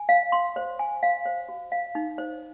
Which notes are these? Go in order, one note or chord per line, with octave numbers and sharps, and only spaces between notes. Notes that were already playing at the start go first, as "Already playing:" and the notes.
Already playing: G#5
F5
C6
C5
G#5
F5
C5
F#4
F5
D#4
C5